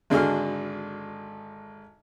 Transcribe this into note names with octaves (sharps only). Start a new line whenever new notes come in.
G#1 D3 F#4 G#4 F6